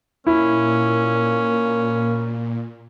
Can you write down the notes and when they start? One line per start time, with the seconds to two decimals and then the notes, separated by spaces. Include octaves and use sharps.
0.27 A#2 A#3 C#4 E4